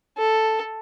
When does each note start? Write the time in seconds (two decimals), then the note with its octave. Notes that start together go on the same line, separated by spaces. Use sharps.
0.18 A4